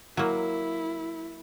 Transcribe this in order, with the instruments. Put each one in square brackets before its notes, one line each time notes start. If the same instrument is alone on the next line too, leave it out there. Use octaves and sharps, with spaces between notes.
[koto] F#3 A#3 [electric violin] E4